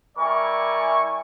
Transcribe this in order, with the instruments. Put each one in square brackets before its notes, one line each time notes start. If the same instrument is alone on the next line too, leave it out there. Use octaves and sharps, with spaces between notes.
[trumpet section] G3 E4 A#4 D5 G#5 C#6